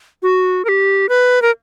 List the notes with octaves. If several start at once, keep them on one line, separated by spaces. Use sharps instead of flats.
F#4
A#4
G4
B4
A#4